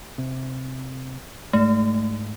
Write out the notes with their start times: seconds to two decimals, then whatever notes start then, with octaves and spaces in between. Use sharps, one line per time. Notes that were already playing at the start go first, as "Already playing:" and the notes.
0.18 C3
1.53 G#2 G#3 A3